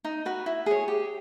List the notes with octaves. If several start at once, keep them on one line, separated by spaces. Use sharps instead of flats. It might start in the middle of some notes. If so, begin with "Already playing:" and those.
D#4
F#4 B4
E4
G#4 C#5
G4